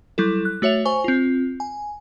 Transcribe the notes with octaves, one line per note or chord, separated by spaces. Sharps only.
F#3 G3 E4 A4
F#6
A3 F#4 C#5 E5 F7
C5 G#5 C#6
C4 F4
G#5